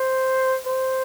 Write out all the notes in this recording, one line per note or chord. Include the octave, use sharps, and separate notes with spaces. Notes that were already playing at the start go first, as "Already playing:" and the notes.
Already playing: C5
C5